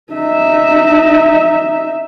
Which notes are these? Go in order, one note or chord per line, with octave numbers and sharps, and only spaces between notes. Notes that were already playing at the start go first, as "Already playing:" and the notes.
D#4 E5